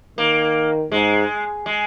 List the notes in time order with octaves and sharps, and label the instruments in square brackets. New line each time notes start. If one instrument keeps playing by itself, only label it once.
[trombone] D#3 [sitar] A#3
[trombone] G#2 [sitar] G#3
[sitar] G#3